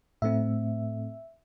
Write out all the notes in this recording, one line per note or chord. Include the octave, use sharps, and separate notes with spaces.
A2 A3 C4 E5